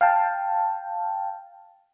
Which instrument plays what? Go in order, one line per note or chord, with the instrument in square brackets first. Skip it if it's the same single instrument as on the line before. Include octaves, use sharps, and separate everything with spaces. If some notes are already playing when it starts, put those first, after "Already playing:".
[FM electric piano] F5 G5 A5